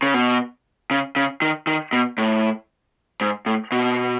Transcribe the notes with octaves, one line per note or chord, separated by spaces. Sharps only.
C#3
B2
C#3
C#3
D#3
D#3
B2
A2
G#2
A2
B2